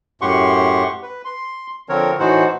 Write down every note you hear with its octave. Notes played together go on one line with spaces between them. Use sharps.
F#2 A2 G4 F#5 C6 C#6
B4
C6
D3 F3 C4 A#4 C#5
A2 E3 D#4 F#4 C5 F#5